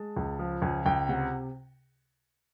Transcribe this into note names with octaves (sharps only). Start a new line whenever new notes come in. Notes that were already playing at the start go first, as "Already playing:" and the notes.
Already playing: G#3 A5
C#2
F3
C#2 G#5
C#2 G5
C3 F#5